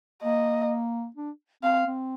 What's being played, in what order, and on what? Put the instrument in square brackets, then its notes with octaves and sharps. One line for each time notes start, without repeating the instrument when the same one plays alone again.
[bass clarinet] A#3 [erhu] D#5
[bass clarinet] D4
[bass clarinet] C4 [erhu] F5
[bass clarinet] C4